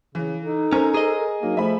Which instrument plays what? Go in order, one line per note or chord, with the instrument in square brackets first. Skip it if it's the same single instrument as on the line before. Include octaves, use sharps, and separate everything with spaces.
[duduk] C#3 [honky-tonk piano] E3
[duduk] D#4 [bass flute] A4
[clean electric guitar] C#4 [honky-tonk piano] A#4 C5
[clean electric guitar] G#4 D#5
[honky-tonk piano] F#3 [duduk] A#3 [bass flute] D#4
[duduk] F3 [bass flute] A3 [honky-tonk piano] E5 B5